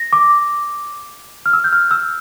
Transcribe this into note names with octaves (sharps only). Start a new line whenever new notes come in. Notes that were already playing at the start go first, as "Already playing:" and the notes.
Already playing: A#6
D6
F6
E6
G6
F6
E6